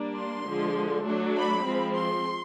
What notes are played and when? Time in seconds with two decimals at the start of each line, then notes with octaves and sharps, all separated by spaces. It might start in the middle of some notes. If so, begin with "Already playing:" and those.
Already playing: G3 A#3 D4
0.18 C6
0.48 D3 F3 G#3
1.06 F#3 A3 D4
1.36 B5
1.66 F3 G#3 C4
1.95 C6